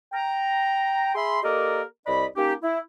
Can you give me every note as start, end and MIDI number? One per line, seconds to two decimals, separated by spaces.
0.12 1.15 79
0.12 1.15 82
1.15 1.40 68
1.15 1.40 76
1.15 1.40 83
1.15 1.40 84
1.43 1.82 58
1.43 1.82 67
1.43 1.82 69
1.43 1.82 70
1.43 1.82 74
1.43 1.82 75
2.07 2.26 36
2.07 2.26 74
2.07 2.26 75
2.07 2.26 83
2.36 2.53 58
2.36 2.53 61
2.36 2.53 63
2.36 2.53 67
2.63 2.78 64